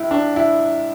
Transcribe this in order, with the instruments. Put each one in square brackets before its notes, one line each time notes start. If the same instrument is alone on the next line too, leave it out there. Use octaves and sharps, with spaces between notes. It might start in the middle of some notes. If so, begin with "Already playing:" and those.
Already playing: [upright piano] C#2 E4
D4
E4